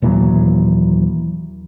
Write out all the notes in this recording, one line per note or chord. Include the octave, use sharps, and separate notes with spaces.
D#2 A#2 E3 F#3